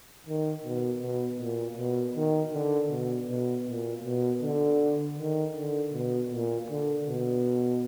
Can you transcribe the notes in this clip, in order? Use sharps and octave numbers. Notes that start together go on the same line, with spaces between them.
D#3
B2
B2
A#2
B2
D#3
D3
B2
B2
A#2
B2
D3
D#3
D3
B2
A#2
D3
B2